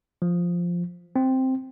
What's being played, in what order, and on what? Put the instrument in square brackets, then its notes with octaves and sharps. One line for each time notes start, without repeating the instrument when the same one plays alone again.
[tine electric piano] F3
C4